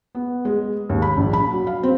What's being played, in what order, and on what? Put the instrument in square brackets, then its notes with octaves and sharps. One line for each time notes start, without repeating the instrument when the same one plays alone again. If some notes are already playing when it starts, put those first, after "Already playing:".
[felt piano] B3
G#3
D#2
B5
A#1
B5
F#3
F5
C4